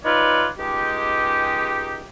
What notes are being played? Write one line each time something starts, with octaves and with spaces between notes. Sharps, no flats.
D#4 F4 B4 C#5 D5
C#2 G#3 D#4 G4